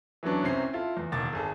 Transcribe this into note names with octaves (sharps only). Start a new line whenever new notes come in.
E3 F#3 B3 C#4 D4 C#5
C2 C3 C4 C#4 C7
E4 F4 A4
E2
E1 D#2 D6 A6
G#1 G#4 A4